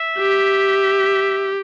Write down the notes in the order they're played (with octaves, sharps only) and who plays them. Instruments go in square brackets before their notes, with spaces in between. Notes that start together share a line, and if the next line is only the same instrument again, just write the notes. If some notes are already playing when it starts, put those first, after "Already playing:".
Already playing: [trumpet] E5
[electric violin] G4